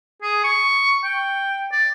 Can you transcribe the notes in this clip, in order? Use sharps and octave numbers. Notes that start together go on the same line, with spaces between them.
G#4
C#6
G5
D5